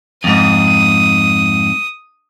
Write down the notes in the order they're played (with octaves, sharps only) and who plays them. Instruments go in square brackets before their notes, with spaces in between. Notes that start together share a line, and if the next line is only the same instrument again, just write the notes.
[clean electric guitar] F2 G#2 [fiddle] D#6